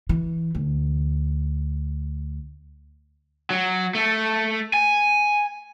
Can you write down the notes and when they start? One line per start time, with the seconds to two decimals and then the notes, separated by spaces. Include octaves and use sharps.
0.09 E3
0.55 D2
3.50 F#3
3.95 A3
4.74 G#5